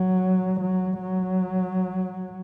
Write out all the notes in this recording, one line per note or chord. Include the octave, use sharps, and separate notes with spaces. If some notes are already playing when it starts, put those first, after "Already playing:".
Already playing: F#3
F#3
F#3